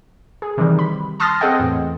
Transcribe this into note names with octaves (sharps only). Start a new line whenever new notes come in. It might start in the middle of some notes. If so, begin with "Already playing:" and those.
G#4
C3 D#3 E3 G3
B5
A5 C6 D#6 F6 A6 A#6
C4 G#4 A4 D#5 F#5 G5
E2 A2